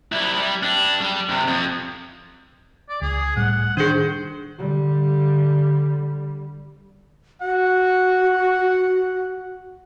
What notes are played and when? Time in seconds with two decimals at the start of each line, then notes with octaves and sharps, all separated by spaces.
0.12 G3 E4
0.38 G3
0.63 D4 G4
1.01 G3
1.29 G2 C3
1.48 F2
2.89 D5
3.01 C#2 G#4
3.37 A2 G3 F#5
3.77 D#3 D4 G#4 C5
4.58 D3 G3
7.42 F#4 F#5